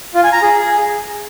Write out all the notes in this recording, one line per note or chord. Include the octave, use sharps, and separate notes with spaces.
F4
G#5
A#5
G#4